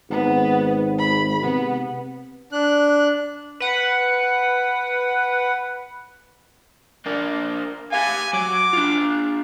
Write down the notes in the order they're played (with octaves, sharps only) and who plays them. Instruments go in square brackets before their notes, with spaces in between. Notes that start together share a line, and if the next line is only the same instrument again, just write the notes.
[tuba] G#1 [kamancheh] B3 B4
[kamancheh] B5
[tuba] C3 [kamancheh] B3
[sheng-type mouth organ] D4 F#6
[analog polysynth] B4 F#5
[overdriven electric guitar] A#3 D4
[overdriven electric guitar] G4 F5 [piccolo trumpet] G#5
[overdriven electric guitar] F#3 [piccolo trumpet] D6
[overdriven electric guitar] D4 F4